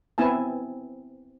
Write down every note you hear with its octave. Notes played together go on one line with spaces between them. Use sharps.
B3 C4 E4 G#5 A5